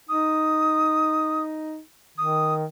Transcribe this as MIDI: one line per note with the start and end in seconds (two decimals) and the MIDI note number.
0.09 1.79 63
0.09 1.42 87
2.18 2.65 51
2.18 2.54 87